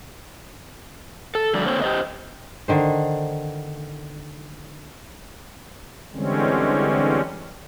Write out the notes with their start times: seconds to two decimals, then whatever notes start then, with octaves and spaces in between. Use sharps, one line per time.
1.35 A4
1.54 D3 F3 G3 A3 F#4 D5
1.66 D3 A#3 C4 C5 C#5
1.81 G4 C5 D#5
2.68 D3 D#3 C5
6.13 D3 E3 G3 G#3 C4 C#4